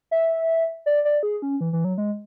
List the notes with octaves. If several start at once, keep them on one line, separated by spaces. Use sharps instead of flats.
E5
D5
D5
G#4
C#4
E3
E3
F#3
G#3